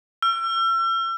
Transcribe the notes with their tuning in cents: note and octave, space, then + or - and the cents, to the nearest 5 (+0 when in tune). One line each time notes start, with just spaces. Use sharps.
E6 +40